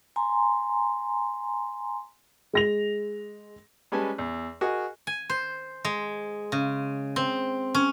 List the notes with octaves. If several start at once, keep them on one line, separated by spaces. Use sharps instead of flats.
G#5 A#5 C6
G#3 A#6 F7
G3 G#3 C#4 B4 G#5 A5
E2
F#4 G#4 A#4 D#5
G#5
C5
G#3
C#3
C4
C#4